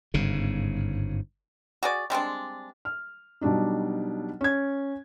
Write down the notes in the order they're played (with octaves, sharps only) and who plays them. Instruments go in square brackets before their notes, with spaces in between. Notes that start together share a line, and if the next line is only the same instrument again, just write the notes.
[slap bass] G1 G#2 C#3
[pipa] F#4 G#4 D5
G3 G#3 C4 D4
[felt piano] F6
B2 F#3 G3 D4 D#4
C#4 G#6